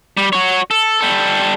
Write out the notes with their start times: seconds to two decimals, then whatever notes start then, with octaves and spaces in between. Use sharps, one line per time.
0.17 G3
0.33 F#4 C#5
0.71 A4
1.01 G3 A4